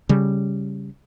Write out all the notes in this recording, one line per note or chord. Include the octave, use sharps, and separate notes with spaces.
C#3 G3